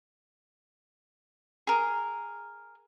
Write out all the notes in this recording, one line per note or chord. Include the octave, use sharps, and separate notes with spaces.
G#4 A#4